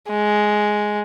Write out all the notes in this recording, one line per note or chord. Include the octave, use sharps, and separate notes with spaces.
G#3